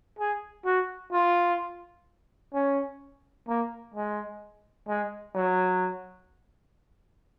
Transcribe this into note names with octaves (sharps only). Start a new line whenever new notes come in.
G#4
F#4
F4
C#4
A#3
G#3
G#3
F#3